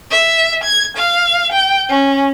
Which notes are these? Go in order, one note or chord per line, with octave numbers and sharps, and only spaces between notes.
E5
G#6
F5
G5
C#4